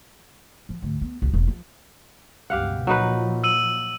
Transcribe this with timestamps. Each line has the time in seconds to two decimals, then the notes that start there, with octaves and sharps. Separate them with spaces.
0.69 F3
0.82 D2 G#2
1.01 B3
1.22 C2 F#3
1.33 E1 F#2
1.48 F3
2.50 C#2 G2 B2 G4 F5 F#5
2.87 A#2 F3 F#3 D#4 B4
3.44 E6 D#7 F#7